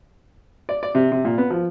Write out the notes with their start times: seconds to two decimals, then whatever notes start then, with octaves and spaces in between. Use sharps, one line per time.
0.69 D5
0.83 D5
0.95 C3
1.12 C3
1.25 A#2
1.38 B3
1.50 F3